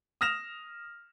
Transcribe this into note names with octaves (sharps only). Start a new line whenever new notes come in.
D#6 F6 A#6 E7 F7